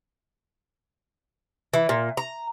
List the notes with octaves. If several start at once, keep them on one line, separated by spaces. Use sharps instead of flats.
E3
A#2
A#5